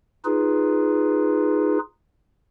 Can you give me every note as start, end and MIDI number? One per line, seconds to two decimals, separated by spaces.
0.25 1.78 63
0.25 1.78 65
0.25 1.78 68
0.25 1.78 71